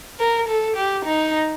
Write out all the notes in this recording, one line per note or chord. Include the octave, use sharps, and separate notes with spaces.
A#4
A4
G4
D#4